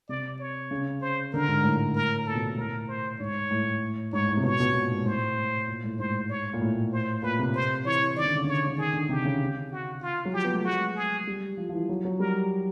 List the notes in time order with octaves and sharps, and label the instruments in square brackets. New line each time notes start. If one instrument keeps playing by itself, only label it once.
[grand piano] C3 [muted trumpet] D5
[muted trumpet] C#5
[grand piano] C#3
[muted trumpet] C5
[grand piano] D3 [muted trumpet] A#4
[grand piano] G#2
A2
[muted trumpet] A#4
[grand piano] A#2 [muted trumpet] A4
[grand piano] B2
A#2
[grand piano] A2 [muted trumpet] A#4
[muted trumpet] C5
[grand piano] G#2 [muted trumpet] C#5
[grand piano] A2
[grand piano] G#2 [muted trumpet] C#5
[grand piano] A2
C3
[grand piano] B2 [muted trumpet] C#5
[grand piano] B2
A#2
G#2
[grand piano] A2 [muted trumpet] C5
[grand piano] A#2
A2
[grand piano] G#2 [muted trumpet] C5
[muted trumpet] C#5
[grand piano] A#2
A2
[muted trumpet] C5
[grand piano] A#2 [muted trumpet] B4
[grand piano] C3
[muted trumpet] C5
[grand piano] E3 [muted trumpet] C#5
[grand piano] E3
[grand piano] D#3 [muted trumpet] D5
[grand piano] D3
C#3
[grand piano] D3 [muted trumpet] C#5
[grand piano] D3
[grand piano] D#3 [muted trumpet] G#4
[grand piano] D3
[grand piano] C3 [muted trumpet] G4
[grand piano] C#3
[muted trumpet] F#4
F4
[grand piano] F#3
[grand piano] F3 [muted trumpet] G4
[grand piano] B3
A3
[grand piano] G#3 [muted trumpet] F#4
[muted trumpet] G#4
[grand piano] G3
F3
F3
E3
F#3
F#3
[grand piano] G3 [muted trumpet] A#4